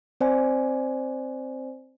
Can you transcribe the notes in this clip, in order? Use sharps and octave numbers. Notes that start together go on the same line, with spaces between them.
C4 C5 D5 G#5